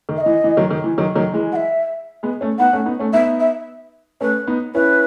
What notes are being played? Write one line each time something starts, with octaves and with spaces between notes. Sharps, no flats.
D#3
E5
D#5
E3
E3
D#3 F#3
D#3
E3
D#3 F#3
D#3 F#3
E3 G#3
F#5
E5
G#3 B3
A3 C#4
B3 D#4 F#5
A3 C#4
B3 D#4
A3 C#4
B3 D#4 E5
E5
A3 C#4 B4
B3 D#4
C#4 E4 B4